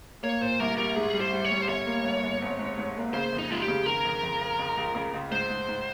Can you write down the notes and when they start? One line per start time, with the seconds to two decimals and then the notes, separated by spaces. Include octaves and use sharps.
0.23 A#3 C#5
0.41 A#2 C5
0.60 C2 A#4
0.78 G3 A#4
0.96 G#2 G#4
1.14 G3
1.20 C5
1.33 G3
1.45 C#5
1.51 G3
1.62 C5
1.68 G1 C#5
1.86 A#3
2.04 G2
2.23 G1
2.42 G#1
2.59 G#2
2.78 G#2
2.96 A#3
3.14 C#3 C5
3.32 F2
3.38 D#4
3.50 G#3 F4
3.62 G4
3.68 C#3
3.86 D#3 A#4
4.05 F2
4.23 F2
4.41 F2
4.59 C#2
4.77 C#2
4.95 C#3
5.14 C#2
5.31 G#2 C5
5.49 G#2
5.68 G#2